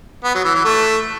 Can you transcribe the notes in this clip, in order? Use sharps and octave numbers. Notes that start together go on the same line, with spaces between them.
B3
F#3
E3
E3
A3